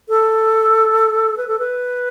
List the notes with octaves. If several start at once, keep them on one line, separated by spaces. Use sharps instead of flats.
A4
B4
A4
B4